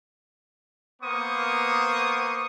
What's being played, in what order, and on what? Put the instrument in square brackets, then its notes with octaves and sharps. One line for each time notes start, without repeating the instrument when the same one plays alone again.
[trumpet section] A#3 B3 C5 C#6 D#6